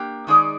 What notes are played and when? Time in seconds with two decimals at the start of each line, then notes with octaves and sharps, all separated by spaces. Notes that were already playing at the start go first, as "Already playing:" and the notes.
Already playing: A#3 D4 G4
0.27 D#3 G#3 D#4 G#4 D5